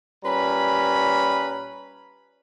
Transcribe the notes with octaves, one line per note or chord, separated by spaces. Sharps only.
A#2 G3 C#4 B4 A#5 B5